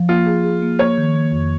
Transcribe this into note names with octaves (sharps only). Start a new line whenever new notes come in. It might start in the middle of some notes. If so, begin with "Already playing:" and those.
Already playing: F3
A#3 F4
G#4
G#4
A#3
A#3 C#5
D#3
A#3
F2